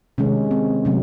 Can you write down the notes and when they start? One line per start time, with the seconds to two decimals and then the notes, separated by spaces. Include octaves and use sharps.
0.18 C3 D#3 G#3 C#4
0.51 C4
0.85 C3 F#3 A3 C#4